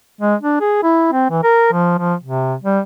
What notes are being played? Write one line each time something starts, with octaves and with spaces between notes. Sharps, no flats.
G#3
D4
G#4
E4
C4
E3
A#4
F3
F3
C3
G3